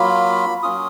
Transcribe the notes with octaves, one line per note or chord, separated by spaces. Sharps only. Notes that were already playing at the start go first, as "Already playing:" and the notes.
Already playing: F#3 A#3 F4 B5
F#3 A#3 C#4 F4 D#6